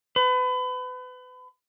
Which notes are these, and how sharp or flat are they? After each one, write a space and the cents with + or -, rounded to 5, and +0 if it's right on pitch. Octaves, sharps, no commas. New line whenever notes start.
B4 +30